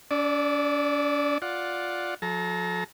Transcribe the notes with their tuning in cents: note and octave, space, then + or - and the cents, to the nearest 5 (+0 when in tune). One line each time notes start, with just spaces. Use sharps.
D4 -45 D5 +0 E6 -30
F4 +10 D5 +0 F#5 +0
F3 +40 A4 -35 A#5 +0